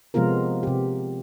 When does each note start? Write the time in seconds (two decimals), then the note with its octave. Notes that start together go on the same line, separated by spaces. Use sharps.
0.14 C3 F3 G#3 B3 F4 A#4
0.63 C3 G4